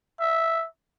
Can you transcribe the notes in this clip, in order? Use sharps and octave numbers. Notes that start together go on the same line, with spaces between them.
E5